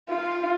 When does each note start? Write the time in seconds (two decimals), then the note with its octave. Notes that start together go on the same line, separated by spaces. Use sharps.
0.09 F4